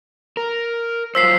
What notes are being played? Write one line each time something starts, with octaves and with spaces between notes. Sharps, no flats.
A#4
F#3 F4 C5 E6 B6 C7